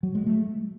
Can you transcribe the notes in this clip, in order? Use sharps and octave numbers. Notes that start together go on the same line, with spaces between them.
F#3
G#3
A3